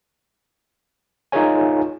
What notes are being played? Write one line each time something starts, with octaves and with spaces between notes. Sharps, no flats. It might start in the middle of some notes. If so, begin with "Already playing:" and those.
D#4 F4 G#4 A#4 C#5 G#5